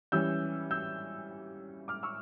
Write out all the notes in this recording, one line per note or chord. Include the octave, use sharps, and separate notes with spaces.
E3 G3 C#4 E6 G6
E6 G6
D6 F6
C#6 E6